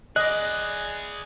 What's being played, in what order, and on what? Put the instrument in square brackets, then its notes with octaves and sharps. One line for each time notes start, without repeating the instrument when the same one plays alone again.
[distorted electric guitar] G#4 D5 [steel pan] D#5 [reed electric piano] F#6